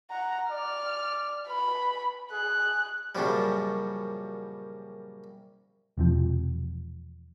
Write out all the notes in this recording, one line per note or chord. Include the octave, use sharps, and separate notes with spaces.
F#5 A#5
D5 F6
B4 B5
G#4 F#6
F#2 A#2 C#3 F3 G3
E1 C3 F3